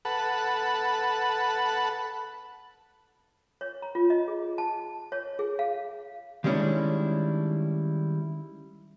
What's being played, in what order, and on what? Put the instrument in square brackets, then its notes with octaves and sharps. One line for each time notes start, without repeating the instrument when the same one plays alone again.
[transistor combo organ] A4 B4 F#5
[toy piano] C#5
A#5
F4
D#5
G#4
A5
C#5
G#4
F5
[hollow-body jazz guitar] D#3 G3 G#3 C#4 D4 E4